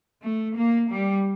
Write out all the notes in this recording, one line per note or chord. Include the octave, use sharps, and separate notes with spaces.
A3
A#3
G3